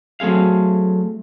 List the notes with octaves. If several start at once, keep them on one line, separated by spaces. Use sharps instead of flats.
F#3 A3 C4 G#4 F5